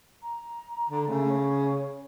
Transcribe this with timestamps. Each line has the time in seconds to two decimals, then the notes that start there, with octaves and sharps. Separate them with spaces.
0.22 A#5
0.90 D3
1.07 C#3 A3
1.29 C#5